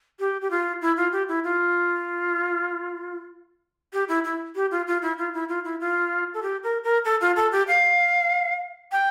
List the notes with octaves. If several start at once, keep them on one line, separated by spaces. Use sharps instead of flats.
G4
G4
F4
E4
F4
G4
E4
F4
G4
E4
E4
G4
F4
F4
E4
F4
E4
F4
E4
F4
A4
G4
A#4
A#4
A4
F4
A4
G4
F5
G5